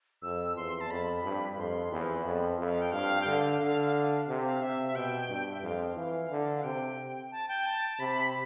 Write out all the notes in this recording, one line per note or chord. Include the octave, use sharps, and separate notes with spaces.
F2 E6
E2 C6
A5
F2 B5
G2
F2 C6
E2 B5
F2
F2 E5
F5
G5
G2 F5
G5
D3 F5
D3
C3
F5
C3 E5
B2 G5
G2
E5
F2 F5
E3 F5
D3
F5
C3 G5
A5
G5
A5
C3 B5